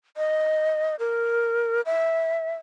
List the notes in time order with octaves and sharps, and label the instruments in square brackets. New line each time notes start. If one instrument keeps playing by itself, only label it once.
[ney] D#5
A#4
E5